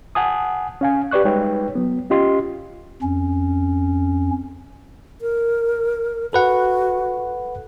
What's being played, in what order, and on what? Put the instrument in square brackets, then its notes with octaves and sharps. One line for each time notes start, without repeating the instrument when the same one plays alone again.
[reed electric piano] F#5 G#5 A5 D#6
C#4 F5 G#5
G4 B4 D5 C#6 F#6
G3 G#3 D#4 B4 C#5 G5
F#3 B3
C#4 F4 G4 D#5 C6
[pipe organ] F2 C#4
[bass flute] A#4
[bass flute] F#4 [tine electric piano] A4 B4 F#5